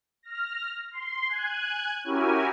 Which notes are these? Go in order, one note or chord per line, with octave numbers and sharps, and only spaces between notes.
F6 A#6
C6
G#5 F#6 G#6
C#4 E4 F#4 G4 A#4 G#5